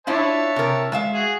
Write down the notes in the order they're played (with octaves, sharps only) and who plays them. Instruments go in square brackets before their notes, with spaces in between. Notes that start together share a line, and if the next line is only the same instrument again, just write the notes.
[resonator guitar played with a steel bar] D4 E4 F4 [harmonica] C#5 E5 A5
[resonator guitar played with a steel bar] C3 A#4
G#3 E5 F5
[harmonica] F#4 G#4